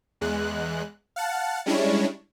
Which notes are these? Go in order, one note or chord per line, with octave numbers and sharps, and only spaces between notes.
E2 G#3 F#6
F5 F#5 A5
G3 G#3 C#4 D4 E4 C#5